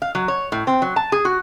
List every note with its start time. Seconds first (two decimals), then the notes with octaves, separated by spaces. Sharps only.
0.02 F5
0.15 F#3
0.28 C#5
0.52 A2
0.67 C4
0.82 F#3
0.96 A5
1.12 G#4
1.25 F#4